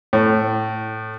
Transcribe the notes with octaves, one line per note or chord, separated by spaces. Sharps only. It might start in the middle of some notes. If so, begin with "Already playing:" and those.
A2